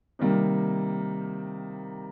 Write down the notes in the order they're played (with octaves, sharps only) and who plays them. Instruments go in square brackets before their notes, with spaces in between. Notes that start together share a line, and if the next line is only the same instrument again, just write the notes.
[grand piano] C3 D#3 G3 A#3